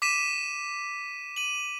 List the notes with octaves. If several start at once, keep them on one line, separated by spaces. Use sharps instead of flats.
D6 B6 D#7 E7
D#7 F#7